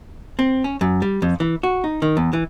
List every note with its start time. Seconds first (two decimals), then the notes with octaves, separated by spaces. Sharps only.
0.39 C4
0.64 C#4
0.81 F#2
1.02 G3
1.22 F2
1.40 E3
1.63 F#4
1.84 D#4
2.02 D#3
2.17 E2
2.33 E3